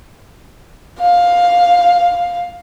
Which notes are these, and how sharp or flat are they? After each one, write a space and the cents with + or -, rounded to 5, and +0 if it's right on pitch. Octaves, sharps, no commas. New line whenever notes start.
F5 +10